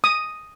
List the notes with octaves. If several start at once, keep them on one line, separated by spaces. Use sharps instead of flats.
D#6